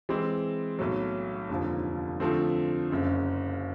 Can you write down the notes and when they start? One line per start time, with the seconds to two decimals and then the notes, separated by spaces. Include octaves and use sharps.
0.09 E3 G#3 C4
0.79 B1 A2 F#3
1.49 F1 D#2 D3 F3
2.20 D3 F3 A3 C4
2.90 F#1 F#2 C#3